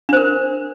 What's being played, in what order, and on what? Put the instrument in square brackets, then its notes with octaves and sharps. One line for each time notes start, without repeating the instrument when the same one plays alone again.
[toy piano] D4
C5
A#4